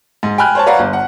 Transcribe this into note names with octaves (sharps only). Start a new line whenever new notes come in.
G#2
G5 G#5 B5 F6 F#6
C5 C#5 A5
B4 C#5 D5 F5 F#5 A#5
G1
F#5